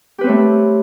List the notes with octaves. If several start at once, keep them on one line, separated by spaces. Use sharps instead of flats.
A3 C4 G4 B4 C#5